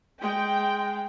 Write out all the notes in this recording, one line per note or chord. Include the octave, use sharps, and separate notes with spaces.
G#3 G5